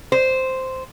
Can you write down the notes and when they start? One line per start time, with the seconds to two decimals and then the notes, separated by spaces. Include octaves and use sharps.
0.12 C5